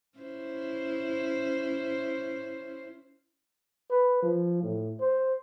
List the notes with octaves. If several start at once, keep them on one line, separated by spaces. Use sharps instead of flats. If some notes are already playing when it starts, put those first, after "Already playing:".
C#4 E4 C5
B4
F3
A2
C5